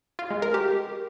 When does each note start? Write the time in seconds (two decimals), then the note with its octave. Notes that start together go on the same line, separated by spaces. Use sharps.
0.19 F4
0.31 G#3
0.42 A#4
0.54 G4